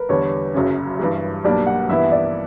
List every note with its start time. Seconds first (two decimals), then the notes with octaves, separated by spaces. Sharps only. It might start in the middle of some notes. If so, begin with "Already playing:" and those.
Already playing: A#4 B4
0.09 E2 D3 G3 C#5
0.54 F#1 F#2 C#3 F#3 C#4
0.99 G2 E3 G3
1.44 B1 B2 G3 A#3 D4 D5
1.66 F#5
1.89 G2 E3 B3 E4 E5
2.12 D5